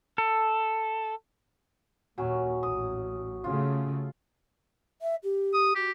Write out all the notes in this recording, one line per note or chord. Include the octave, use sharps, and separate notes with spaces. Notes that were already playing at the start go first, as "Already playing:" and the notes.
A4
D#2 A#2 F#3 C#4
A1 D#6
C#3 A3 F4
E5
G4
D#6
F#4 G4